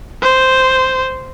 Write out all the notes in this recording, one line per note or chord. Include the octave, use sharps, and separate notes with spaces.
C5